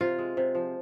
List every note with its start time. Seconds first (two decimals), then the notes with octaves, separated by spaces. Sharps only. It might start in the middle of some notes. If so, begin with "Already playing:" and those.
0.01 C3 F4
0.19 G#3
0.37 C3
0.55 F3